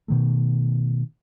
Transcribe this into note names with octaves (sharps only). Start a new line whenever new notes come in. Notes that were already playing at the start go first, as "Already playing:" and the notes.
B2 D#3 A3